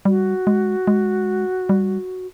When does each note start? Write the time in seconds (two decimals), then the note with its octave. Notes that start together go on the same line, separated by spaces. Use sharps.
0.05 G3 F#4
0.47 G#3
0.87 G#3
1.69 G3